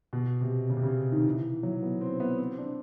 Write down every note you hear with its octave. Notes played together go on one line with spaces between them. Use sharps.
B2
C3
C#3
C3
C#3
D#3
E3
F#3
B3
C4
B3
C4
D4